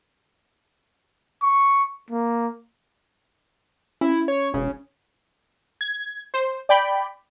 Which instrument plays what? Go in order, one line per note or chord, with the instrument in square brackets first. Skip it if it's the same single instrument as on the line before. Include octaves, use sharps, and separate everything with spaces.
[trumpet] C#6
A#3
[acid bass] C#4 [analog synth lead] E4
[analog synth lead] C#5
[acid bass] E1 [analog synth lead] C#3
[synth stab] G#6
C5
D5 G5 B5